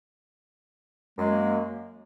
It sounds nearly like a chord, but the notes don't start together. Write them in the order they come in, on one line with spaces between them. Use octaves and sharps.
F#2 G#3 A#3